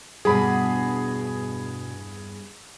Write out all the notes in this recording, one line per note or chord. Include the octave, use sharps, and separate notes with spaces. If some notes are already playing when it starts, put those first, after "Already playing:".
E2 G2 B2 G3 G#4 B5